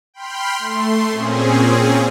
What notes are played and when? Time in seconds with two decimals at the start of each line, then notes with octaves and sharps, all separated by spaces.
0.14 G5 B5 C6 F6
0.59 A3 C6
1.11 A#2 C4 C#4 G#4